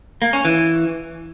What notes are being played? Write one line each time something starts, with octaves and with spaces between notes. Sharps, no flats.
A#3
C#4
E3